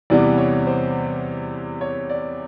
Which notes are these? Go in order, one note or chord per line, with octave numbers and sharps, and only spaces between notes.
E2 C3 E3 G3 B3 D5
C#5
C5
C#5
D5